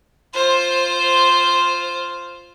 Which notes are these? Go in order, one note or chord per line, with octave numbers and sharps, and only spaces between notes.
F4 C5